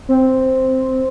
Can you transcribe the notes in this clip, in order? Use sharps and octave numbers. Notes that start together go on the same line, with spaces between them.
C4